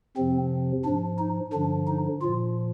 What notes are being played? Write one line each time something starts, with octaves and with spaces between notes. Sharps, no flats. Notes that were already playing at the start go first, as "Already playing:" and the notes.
F2 C3 F3 C4
G#2 F3 D4
D#4
G2 D3 F3 D4
D#4
A#2 F3 F4